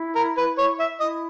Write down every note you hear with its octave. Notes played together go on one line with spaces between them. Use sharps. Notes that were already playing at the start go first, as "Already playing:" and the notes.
Already playing: E4
A#4
B4
C#5
E5
E4 D#5